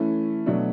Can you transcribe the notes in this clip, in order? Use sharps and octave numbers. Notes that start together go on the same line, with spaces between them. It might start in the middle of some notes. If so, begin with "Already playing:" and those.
Already playing: E3 A3 C#4
B2 F#3 A3 D4